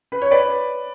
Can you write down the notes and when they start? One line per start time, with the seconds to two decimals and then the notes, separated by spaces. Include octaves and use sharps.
0.12 B4
0.22 C#5
0.31 B4 D5